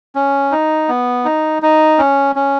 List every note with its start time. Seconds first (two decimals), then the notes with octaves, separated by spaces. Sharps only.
0.15 C#4
0.52 D#4
0.89 B3
1.25 D#4
1.62 D#4
1.98 C#4
2.36 C#4